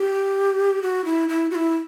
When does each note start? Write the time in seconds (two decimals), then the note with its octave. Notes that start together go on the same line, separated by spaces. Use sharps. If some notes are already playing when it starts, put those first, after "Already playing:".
Already playing: G4
0.82 F#4
1.05 E4
1.29 E4
1.51 F#4
1.55 E4